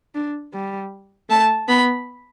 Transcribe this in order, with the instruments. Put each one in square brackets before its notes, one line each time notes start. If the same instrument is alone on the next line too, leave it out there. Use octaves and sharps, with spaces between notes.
[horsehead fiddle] D4
G3
[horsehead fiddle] A3 [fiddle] A5
[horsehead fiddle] B3 [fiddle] B5